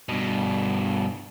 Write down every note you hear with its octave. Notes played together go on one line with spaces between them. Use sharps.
G2 B2